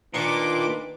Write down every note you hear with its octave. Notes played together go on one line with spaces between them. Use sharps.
A#2 D#3 D4 B4 D6